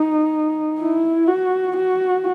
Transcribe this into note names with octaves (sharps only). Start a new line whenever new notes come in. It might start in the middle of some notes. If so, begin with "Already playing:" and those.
Already playing: D#4
E4
F#4
F#4